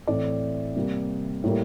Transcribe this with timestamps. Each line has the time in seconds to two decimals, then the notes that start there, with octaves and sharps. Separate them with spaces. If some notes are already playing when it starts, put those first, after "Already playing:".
0.07 A2 E3 A3 C4 D5
0.75 C3 G3 A#3
1.44 A2 G3 A#3